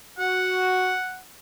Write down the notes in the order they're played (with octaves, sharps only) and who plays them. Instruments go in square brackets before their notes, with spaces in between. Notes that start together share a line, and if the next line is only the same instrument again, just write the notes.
[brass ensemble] F#4 [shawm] F#5